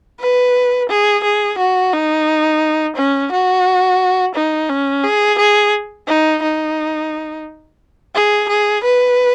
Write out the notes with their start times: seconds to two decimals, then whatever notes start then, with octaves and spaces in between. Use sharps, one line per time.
0.20 B4
0.89 G#4
1.24 G#4
1.58 F#4
1.93 D#4
2.96 C#4
3.32 F#4
4.35 D#4
4.69 C#4
5.04 G#4
5.39 G#4
6.07 D#4
6.42 D#4
8.14 G#4
8.49 G#4
8.84 B4